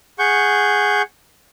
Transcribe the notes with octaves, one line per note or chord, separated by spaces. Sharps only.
G#4 F#5 C#6 G6